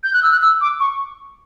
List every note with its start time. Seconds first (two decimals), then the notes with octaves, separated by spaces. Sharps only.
0.04 G6
0.13 F#6
0.23 E6
0.32 F#6
0.42 E6
0.61 D6
0.80 C#6